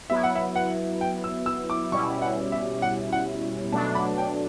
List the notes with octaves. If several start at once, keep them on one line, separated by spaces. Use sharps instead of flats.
F#3 B3 E4 E5
F#5
E5
F#5
G5
E6
E6
D6
B2 G3 C#4 E4 C#6
F#5
E5
F#5
F#5
B2 F#3 A3 D4 A5
B5
G5